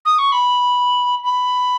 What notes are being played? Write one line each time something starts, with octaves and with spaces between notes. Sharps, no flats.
D#6
C#6
B5
B5